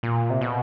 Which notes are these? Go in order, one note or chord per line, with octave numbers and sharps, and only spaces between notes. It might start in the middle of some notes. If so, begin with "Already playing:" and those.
A#2
C3
B2